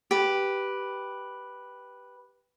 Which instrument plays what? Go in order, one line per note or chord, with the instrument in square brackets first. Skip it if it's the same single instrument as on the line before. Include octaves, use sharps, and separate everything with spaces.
[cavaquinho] G4 B4